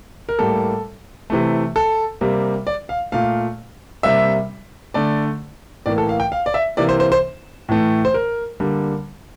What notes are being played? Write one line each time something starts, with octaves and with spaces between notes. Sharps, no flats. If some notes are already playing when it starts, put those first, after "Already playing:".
A#4
A2 G3 A#3 A4
C3 E3 A3
A4
C3 G3 A#3
D5
F5
A#2 A3 F5
C3 G3 A#3 E5
D3 A3 D5
A2 E3 A#3 D5
A4
F5
G5
F5
D5
E5
C3 E3 A#3 D5
C5
C5
C5
A2 E3 A3
C5
A#4
D3 G3 A#3